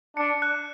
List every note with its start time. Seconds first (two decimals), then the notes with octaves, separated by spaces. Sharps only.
0.17 D4 C#7
0.42 F#6